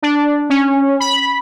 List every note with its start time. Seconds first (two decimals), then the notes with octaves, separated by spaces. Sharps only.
0.02 D4
0.50 C#4
1.00 B5